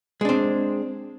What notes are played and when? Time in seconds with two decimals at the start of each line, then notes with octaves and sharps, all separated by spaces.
0.21 G#3
0.25 D4
0.29 C4